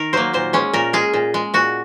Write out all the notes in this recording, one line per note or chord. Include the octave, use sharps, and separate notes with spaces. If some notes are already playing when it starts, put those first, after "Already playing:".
Already playing: D#3 A#4
F#3 A#3 C5
A#2 C5
G#3 C#4
A#2 A#4
G#3 G#4
A#2
G#3
A#2 F#4